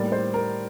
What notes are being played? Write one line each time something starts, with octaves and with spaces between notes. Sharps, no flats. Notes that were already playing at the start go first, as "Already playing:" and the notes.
Already playing: A2 G3 A#3 D5
C5
A#4